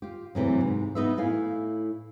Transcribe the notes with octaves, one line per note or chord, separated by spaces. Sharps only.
F4 G4
D2 C3 E3 F#3
G#2
B3 D#4 F#4 B4 D#5 E5
A2 E4 F5 G#5